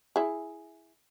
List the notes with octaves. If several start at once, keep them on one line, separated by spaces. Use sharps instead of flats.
E4 G#4